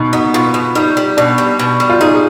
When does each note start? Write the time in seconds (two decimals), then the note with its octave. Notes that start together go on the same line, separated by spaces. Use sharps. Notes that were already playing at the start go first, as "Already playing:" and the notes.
Already playing: B2 D#4
0.13 B3 D#4
0.34 B2 F4
0.54 B2
0.75 G3 D#4
0.97 G3
1.17 B2 D4
1.38 G3
1.59 B2
1.80 G3
1.89 F4
2.01 D#4 G#4